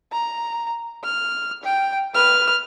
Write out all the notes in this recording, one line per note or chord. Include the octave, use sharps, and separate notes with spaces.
A#5
F6
G5
B4 F6